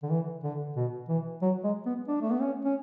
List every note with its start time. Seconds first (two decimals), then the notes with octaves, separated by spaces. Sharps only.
0.03 D3
0.10 E3
0.43 D3
0.76 B2
1.09 E3
1.42 F#3
1.64 G#3
1.86 B3
2.08 D4
2.21 A3
2.31 B3
2.41 C#4
2.64 C#4